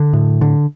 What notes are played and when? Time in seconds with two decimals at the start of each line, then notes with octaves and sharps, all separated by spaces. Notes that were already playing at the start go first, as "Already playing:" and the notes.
Already playing: D3
0.13 A2
0.41 D3